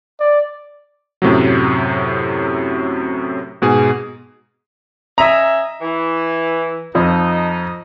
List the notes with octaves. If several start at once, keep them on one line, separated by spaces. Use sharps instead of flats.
D5
F#2 A2 C3 F#3
G#2 B2 G#4
C#4 D#5 E5 A#5
E3
F2 F3 D#4 D#5